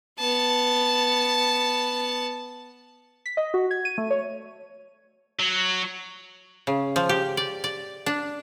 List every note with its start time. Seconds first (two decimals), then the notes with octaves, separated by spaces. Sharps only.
0.19 B3 A5
3.26 B6
3.37 D#5
3.54 F#4
3.71 G#6
3.85 D#7
3.98 A3
4.10 C#5
5.40 F#3
6.67 C#3
6.96 F3
7.09 G4
7.37 D5
7.64 D5
8.06 D4